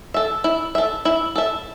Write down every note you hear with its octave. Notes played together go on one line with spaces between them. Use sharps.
A4 E5
E4
A4 E5
E4
A4 E5